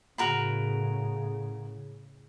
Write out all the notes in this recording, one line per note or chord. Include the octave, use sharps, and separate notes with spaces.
A2 C#3 F#4 A#4 B5